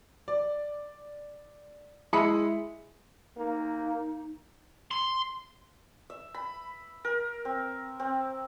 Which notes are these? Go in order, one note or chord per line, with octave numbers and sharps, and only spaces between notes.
D5
G#3 E4 B5 D#6 C#7
A#3 D#4
C6
E5
B5
A#4
C4
C4